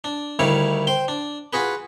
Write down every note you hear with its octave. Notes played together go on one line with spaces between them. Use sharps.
D4
D2 D#3 G3 E4 C#5 F5
C5 G5 C6
D4
F4 F#4 G#4 B4